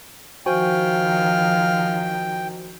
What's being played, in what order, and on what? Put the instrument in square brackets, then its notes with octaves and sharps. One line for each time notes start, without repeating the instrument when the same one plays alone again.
[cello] D#3 F3 [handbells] F#4 C5 G#5 [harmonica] F5 [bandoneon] G5